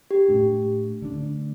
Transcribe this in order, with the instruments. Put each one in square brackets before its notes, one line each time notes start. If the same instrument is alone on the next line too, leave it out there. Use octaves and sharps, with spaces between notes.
[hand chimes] G4
[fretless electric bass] A2 A3 D4
D3 A3 D4